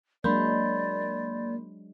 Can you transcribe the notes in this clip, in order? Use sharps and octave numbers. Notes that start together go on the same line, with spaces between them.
F#3 G#3 A#3 D4 D5 B5 C6 G6